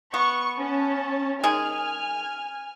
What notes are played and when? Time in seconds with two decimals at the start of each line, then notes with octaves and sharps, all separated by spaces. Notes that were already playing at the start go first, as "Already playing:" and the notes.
0.14 B3 C#6
0.57 C#4 A5
1.44 D#3 G#3 G#4 G#5 F6